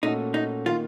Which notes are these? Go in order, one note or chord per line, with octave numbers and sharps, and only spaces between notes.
A#2 A3 C#4 D#4 F#4 A4
D#4
D#3 A#3 F4